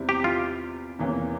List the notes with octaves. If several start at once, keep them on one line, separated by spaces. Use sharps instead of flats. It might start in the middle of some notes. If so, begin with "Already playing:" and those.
Already playing: E2 C3 G3 C4 E4
G4
F4
E2 C3 E3 A#3 C#4